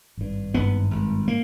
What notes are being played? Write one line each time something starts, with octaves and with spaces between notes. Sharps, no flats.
G#1 G2
G#1 G2 B3
G#1 G2
A#3